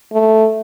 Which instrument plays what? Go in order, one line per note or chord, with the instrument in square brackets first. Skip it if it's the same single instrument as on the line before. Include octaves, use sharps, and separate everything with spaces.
[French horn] A3